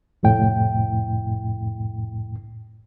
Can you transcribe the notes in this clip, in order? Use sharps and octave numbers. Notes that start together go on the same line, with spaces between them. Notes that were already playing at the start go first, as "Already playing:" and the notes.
C2 F2 A2 G5